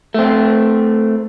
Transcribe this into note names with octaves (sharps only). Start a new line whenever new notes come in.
A3 C4